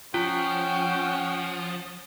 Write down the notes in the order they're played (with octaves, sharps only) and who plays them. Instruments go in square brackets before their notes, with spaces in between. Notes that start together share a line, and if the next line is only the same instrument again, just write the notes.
[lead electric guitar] F3 [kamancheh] C#4 F#5 [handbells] F4 [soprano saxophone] G5